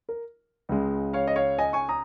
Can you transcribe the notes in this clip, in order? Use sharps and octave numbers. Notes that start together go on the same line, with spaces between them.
A#4
C#2 C#3 G#3
C#5 F5
D#5
C#5 F5
D#5 G#5
G#5 C#6
A#5 D#6